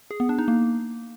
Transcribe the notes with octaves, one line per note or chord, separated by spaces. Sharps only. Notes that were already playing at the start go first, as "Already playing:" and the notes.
G#4
B3
D4
D#4
A#3